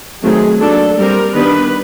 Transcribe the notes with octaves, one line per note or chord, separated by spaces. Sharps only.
D#3 F#3 A3 C4 G#4
F#3 A#3 D4 A4
G3 C4 A#4
D#3 G3 B3 D4 B4